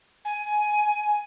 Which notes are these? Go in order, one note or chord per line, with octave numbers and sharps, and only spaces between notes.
G#5